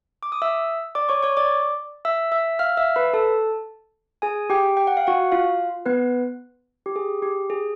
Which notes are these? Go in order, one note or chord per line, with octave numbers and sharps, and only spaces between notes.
D6
D#6
E5 E6
D5 D6
C#5 C#6
C#5 C#6
D5 D6
E5 E6
E5 E6
F5 F6
E5 E6
B4 B5
A4 A5
G#4 G#5
G4 G5
G5
F#5
F5
F#4 F#5
F4 F5
B3 B4
G4
G#4
G4
G#4